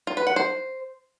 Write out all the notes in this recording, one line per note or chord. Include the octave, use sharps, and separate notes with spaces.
F4
B4
F#5
C5